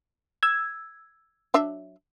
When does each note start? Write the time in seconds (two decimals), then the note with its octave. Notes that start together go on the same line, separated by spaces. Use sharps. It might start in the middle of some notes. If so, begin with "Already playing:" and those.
0.43 E6 G#6
1.54 F#3 D4 E5